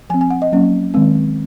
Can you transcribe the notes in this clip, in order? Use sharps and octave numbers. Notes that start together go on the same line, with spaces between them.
F3 C4 G#5
G#5
F#5
D#5
F#3 A#3 C#4
D#3 G#3 C4